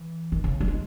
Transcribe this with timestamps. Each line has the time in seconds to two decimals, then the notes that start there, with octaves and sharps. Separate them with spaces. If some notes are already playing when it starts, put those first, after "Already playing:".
Already playing: E3
0.32 D#3
0.44 C#3
0.60 G3
0.68 G#3